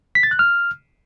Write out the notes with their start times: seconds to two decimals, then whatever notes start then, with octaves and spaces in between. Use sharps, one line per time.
0.15 B6
0.23 A6
0.31 F#6
0.39 F6